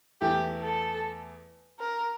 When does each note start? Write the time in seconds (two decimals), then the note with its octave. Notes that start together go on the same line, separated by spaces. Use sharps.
0.21 E2 E3 A3 E4 G4
0.61 A4
1.79 A#4